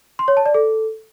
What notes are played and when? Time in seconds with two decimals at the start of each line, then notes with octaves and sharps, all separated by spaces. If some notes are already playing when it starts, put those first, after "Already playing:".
0.19 C6
0.28 C#5
0.37 A5
0.46 D5
0.54 A4